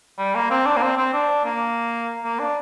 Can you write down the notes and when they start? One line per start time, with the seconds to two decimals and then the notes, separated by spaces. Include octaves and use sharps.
0.19 G3
0.35 A#3
0.51 C4
0.66 D4
0.77 A#3
0.82 C4
0.98 C4
1.13 D4
1.45 A#3
2.24 A#3
2.39 D4